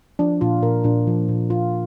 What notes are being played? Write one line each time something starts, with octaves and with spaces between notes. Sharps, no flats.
F3 D4
A#2 F4
A#2 A#4
A#2 D4
F3
A#2
A#2 F4